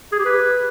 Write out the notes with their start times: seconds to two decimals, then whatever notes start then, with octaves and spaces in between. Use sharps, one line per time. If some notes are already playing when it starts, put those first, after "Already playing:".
0.12 G#4
0.19 G4
0.25 B4